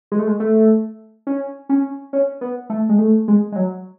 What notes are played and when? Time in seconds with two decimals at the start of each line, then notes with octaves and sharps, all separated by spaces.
0.12 G#3
0.19 A3
0.27 G#3
0.40 A3
1.27 C#4
1.69 C#4
2.13 C#4
2.41 B3
2.70 A3
2.89 G#3
2.99 A3
3.28 G#3
3.52 G#3
3.56 F#3